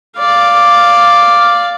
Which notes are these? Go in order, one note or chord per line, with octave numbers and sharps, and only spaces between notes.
D5 F5